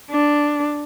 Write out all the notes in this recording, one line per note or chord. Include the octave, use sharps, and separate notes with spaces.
D4